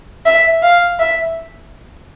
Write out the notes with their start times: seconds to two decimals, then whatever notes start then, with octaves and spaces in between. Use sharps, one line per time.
0.26 E5
0.62 F5
0.99 E5